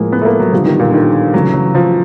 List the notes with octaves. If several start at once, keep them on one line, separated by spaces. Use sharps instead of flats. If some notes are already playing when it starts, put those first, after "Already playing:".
Already playing: A2 F3 G#3 A#3
B3
A3
A#3
F#3
D3 F3 G3 B3
D#3
A#2
D3
D#3
C#3 E3 F#3 A3
F#3
F3